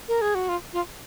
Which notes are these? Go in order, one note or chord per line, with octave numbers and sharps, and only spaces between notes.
A#4
G#4
F#4
F4
F4